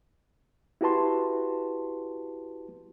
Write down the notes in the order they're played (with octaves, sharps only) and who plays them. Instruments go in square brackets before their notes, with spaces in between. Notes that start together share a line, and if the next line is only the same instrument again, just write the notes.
[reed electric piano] E4 F#4 G4 B4 A5 C6